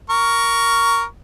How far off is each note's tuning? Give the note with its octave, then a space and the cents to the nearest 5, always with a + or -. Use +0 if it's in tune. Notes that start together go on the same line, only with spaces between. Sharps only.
A#4 +0 C#6 +15